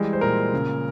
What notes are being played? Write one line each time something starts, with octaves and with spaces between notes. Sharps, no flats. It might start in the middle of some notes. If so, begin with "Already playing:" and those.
Already playing: E3 G3 G#3
C5
A#2 A#4
C#3